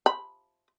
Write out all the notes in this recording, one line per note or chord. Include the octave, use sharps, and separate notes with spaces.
B5